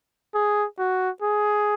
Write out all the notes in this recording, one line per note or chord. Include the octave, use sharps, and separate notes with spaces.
G#4
F#4
G#4